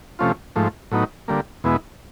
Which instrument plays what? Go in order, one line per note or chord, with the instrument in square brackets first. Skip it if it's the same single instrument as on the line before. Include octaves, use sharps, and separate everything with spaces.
[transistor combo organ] C3 F3 A3 C#4 F4
G#2 F3 A3
A2 F#3 B3 D#4
D3 G3 A#3
E2 B2 G#3 B3 E4